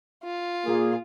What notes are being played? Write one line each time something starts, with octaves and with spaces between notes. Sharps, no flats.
F4
A#2 A#3 G#4